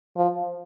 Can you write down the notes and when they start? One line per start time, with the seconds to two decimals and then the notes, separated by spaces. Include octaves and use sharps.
0.17 F3